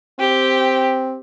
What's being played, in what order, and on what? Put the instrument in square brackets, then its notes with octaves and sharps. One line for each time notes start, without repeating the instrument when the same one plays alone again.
[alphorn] C4 [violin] G4